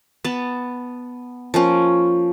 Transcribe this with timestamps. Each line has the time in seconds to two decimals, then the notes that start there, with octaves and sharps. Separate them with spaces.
0.24 B3 A5
1.54 F3 A#3 C#4